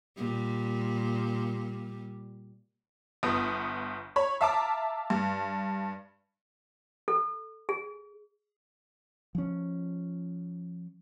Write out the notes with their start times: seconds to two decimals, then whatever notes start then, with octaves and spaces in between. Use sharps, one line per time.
0.17 A#2 G3
3.23 G1 B3 D#6
4.16 C#5 B5
4.41 E5 F5 A5 A#5 D6
5.10 G2
7.08 A4
7.69 G#4
9.35 F3 C#4